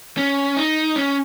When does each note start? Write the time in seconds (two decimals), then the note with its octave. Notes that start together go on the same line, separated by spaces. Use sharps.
0.17 C#4
0.57 D#4
0.96 C#4